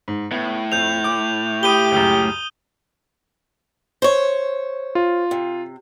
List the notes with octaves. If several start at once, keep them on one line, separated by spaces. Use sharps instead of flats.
G#2
A2 B3
F2 G6 F7
D6
G4 B5 D6 D#6 D#7 G7
C#2 F#2
C5 C#5
F4
C3